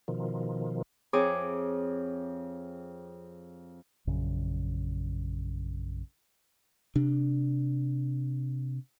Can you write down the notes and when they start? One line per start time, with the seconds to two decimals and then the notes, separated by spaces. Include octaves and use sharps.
0.08 B2 D#3 F3
1.13 F2 C4 G#4 C#5 D6
4.07 A#1 F#2 C#3
6.95 C3 D4